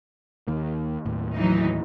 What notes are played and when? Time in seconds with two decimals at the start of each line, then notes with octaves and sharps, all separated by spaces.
0.47 D#2 D#3 A#3
1.06 D#2 A2
1.36 E3 F#3 D#4